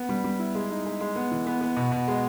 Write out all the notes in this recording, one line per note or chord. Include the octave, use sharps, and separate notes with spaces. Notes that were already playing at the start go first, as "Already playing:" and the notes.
Already playing: B3
G3
G3
E4
G#3
D#4
G#3
G#3
B3
E3
B3
B3
B2
B2
G#3